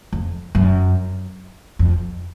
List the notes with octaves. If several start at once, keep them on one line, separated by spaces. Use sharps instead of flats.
F2
F#2
F2